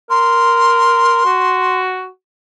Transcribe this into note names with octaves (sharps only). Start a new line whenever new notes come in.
A#4 C6
F#4